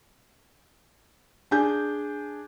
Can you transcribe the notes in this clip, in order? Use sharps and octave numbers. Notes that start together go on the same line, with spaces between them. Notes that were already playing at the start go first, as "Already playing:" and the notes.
D4 G#4 G#5 G6